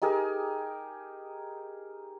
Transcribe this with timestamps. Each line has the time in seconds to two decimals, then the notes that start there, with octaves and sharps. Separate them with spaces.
0.02 D#4 G4 G#4 A#4